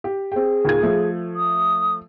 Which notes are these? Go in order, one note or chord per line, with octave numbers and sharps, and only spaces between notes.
G4
C4 G#4 G5
D#2 A#2 G#6
F3 A3
D#6